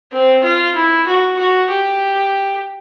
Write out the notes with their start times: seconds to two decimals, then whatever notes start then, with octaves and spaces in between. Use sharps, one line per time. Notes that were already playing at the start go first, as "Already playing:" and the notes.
0.12 C4
0.44 F4
0.75 E4
1.07 F#4
1.39 F#4
1.70 G4